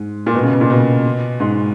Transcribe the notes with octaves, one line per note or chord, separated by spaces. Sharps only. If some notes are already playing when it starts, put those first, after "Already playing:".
Already playing: G#2
A#2
B2
C#3
B2
A#2
B2
G#2